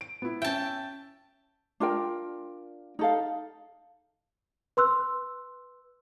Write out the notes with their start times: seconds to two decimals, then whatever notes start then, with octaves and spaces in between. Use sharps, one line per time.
0.01 D7
0.22 B3 E4
0.42 C#4 E5 G5 A5
1.80 D4 F4 A#4 G5
2.99 D#4 A4 F5
4.77 B4 C6 E6 F#6